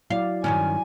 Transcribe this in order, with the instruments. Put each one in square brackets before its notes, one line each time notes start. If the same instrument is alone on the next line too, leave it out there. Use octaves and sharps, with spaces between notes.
[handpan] F#3 E4 D5 [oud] F5
[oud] G2 D#3 C#4 [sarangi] G#5